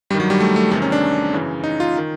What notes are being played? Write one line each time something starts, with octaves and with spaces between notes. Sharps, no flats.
G2 D#3 G3
F#3
G3
A3
A3
E2 C3 D#3 A3
C#4
D4
F#2 C#3 E3
D#4
F4
D#3